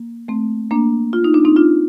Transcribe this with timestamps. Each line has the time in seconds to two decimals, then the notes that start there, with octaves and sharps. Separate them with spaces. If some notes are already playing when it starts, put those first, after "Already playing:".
Already playing: A#3
0.28 A3 C4
0.71 A#3 D4
1.13 F4
1.24 D#4
1.34 D4
1.45 C4 D#4
1.56 D4 F4